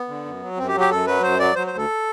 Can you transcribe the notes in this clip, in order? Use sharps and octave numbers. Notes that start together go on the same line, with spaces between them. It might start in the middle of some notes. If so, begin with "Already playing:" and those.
Already playing: B3
D3
F#2
F#3
F#2 C4
G4
F#3
G4
F#2 A4
F#3 B4
F#2 C5
F#3 D5
F#3 C5
C5
D2 A4